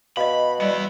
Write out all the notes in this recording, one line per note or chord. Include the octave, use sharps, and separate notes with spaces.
B2 D#5 F5 B5
G3 B3 E4